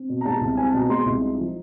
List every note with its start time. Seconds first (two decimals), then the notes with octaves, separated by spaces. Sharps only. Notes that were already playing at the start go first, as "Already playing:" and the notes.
Already playing: C4
0.09 B2
0.21 A#5
0.26 G#3 A5
0.41 C2
0.57 C4 G#5
0.69 A5
0.74 B2
0.79 A#5
0.89 G#3 C6
1.05 C2
1.21 D#4
1.38 F3